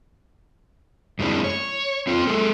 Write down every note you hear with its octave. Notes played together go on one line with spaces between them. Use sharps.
F#2 G#3 C4 D4 E4
C#5
C4 F4 C5 G5
G#3 G#4 A4